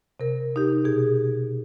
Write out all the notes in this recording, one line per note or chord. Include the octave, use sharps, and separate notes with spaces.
C3 A#4
D#4 G4
B2 G#4